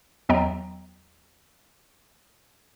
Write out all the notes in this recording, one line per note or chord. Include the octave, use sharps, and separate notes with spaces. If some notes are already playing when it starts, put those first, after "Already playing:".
E2 F#3 B3 D#5 G5 A#5